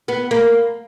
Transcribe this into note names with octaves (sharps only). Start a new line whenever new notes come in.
B3
A#3